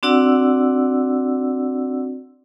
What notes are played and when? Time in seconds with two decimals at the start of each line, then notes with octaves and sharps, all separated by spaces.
0.03 C4 D4 F#4 D5 F#5 E6